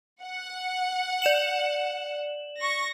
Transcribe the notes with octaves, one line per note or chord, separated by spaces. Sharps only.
F#5
D5 E7 F#7
C#6 A#6